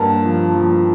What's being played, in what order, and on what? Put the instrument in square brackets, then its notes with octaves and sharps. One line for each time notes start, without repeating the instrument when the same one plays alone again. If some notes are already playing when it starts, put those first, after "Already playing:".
Already playing: [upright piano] G2 A#3 A5 A#5
F3
F3